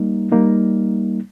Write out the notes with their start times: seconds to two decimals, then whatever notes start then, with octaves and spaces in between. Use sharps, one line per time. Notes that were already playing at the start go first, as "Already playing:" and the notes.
Already playing: G3 A#3 D#4
0.32 G3 A#3 D#4